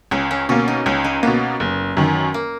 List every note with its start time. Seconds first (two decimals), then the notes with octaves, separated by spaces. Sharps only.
0.11 C#2 C#4
0.31 C#4
0.49 B2 A#3 C#4
0.68 D#4
0.86 C#2 C#4
1.04 D#4
1.23 B2 A#3 B3
1.60 F#1
1.97 F#2 D#3
2.34 A#3